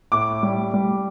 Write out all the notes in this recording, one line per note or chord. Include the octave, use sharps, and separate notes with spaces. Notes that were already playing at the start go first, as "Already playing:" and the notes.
A2 D6
G3
G3